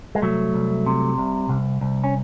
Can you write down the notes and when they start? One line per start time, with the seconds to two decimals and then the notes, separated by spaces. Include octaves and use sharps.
0.15 G#3
0.22 C2 F#3 A3
0.54 C2
0.86 C3
1.18 C2
1.49 C2
1.81 C2
2.04 C#4